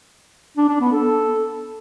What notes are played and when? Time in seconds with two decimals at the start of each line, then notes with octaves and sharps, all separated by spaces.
0.57 D4
0.69 D4
0.81 B3
0.93 A4